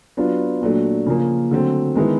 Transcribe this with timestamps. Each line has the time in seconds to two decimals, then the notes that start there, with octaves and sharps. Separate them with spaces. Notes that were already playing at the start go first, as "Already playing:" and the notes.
0.17 F#3 B3 D4 F4
0.61 A#2 F#3 A3 D4
1.06 C#3 F3 A#3
1.51 D3 F#3 A3 C4
1.95 D#3 G#3 B3 E4